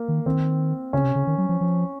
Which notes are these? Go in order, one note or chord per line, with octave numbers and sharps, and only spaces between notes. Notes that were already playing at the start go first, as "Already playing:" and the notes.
Already playing: A#3
D#3
D#3 C4
C#3 C#4
C3
C#3
D#3
F#3
F3
F3